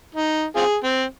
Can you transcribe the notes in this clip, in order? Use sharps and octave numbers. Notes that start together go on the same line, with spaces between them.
D#4
C4 F4 G#4
C4